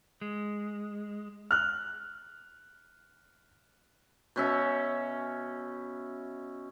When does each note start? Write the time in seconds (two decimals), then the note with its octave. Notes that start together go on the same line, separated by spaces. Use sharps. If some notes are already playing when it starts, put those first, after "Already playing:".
0.22 G#3
1.51 F6 F#6
4.36 B2 C#4 E5